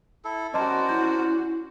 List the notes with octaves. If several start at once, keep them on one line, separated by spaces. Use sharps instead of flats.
E4 A4
C#4 F#4 A#4 C5 D5 D#5 A5
E4 G6